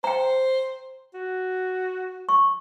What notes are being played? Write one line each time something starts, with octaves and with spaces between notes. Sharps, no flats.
C5 G5 A#5
F#4
C#6